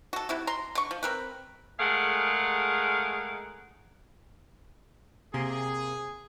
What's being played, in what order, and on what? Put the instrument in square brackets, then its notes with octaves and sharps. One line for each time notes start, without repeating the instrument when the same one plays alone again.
[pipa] F#4 A4
C3 E4 F#4
A#5 C6
D3 C#6
F3
C4 A#4 B4
[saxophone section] G#3 A3 G#4 A#4 F5 F#5
[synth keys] C3 A#3 C6 [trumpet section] G#4